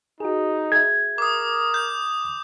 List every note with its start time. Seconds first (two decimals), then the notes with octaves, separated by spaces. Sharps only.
0.20 D#4 F#4 G#4
0.72 G#4 E5 G#6
1.18 A#4 D6 D#6
1.74 G6